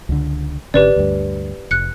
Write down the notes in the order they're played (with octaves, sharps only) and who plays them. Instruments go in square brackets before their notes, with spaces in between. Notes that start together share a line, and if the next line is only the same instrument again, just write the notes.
[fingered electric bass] C#2 D3
[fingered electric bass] G#1 D3 C#4 [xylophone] G4 B4 D5
[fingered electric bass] D2 G2
[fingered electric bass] F1 [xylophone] F#6 C#7